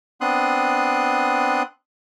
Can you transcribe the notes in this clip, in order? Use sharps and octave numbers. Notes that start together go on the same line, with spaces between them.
B3 C4 D4 C6 D#6 F#6